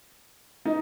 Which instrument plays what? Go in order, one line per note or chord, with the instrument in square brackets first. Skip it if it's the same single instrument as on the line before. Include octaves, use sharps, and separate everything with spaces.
[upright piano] D#4